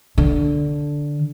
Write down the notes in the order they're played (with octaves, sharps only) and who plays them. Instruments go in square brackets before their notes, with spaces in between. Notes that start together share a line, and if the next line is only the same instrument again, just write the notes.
[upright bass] D3